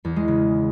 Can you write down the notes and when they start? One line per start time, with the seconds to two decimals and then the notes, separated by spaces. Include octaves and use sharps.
0.05 E2
0.16 G#3
0.28 C#3